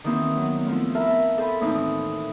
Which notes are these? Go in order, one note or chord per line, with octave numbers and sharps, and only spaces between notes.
D#3 E3 A#3 C4 D4 F#4
F#3 B3
F3 A3 B3 E4 F4
A#4 E5 F5 A5 B5
A4 C5 G#5 B5
D#2 A2 E3 C4 D4 D#4